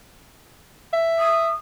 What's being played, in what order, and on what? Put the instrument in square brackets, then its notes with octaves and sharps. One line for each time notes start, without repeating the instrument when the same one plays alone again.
[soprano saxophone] E5
[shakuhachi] D#6